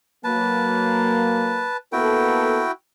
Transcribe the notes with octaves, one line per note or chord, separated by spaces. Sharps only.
F#3 A#3 B4 A5
A#3 B3 E4 F#4 A4 G5